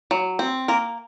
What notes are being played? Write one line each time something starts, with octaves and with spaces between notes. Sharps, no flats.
F#3
C4
A#3 A#4